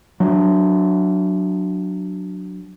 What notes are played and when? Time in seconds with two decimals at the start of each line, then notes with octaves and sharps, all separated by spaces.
0.20 F#3 D4